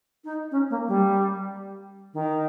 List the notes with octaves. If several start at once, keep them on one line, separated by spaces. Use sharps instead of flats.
D#4
C#4
A#3
G3
D#3